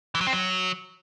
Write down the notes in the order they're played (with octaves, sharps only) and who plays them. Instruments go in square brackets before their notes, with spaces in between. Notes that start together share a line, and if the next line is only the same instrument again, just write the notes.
[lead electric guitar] E3
F#3
C4
F#3